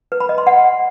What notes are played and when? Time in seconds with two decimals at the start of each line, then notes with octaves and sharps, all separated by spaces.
0.12 B4
0.20 B5
0.29 D#5
0.38 C6
0.47 F#5